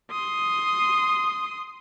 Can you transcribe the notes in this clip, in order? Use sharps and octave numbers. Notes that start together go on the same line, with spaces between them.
C6 D#6